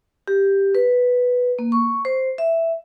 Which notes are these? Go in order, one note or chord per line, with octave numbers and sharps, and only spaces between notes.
G4
B4
A#3
C#6
C5
E5